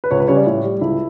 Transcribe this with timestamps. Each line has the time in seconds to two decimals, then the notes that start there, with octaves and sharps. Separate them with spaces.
0.04 B4
0.11 C#2 C#5
0.20 B4
0.28 C#3 G3 C#5
0.37 D5
0.46 A2 C#5
0.65 G3
0.81 C#2 E4